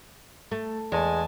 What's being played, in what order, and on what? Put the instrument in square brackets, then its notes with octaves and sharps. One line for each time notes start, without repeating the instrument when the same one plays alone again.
[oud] A3
[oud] E2 [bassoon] G#3 [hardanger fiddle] G#5 A5